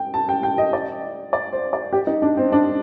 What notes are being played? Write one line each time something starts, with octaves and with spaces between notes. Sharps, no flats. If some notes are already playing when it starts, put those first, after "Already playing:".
Already playing: G5
A5
G5
G5
D#5
D5
D5
C5
D5
G4
D#4
D4
C4
D4